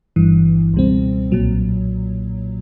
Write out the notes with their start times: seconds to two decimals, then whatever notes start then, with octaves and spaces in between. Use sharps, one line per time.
0.16 G1 G2 E3
0.74 C#2 B2 G3 C4
1.32 B1 A#2 F#3